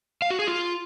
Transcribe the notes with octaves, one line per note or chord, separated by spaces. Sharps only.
F5
F#4
G#4
F4